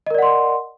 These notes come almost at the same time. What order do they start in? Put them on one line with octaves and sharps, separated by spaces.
D#5 A#4 D5 F#5 C6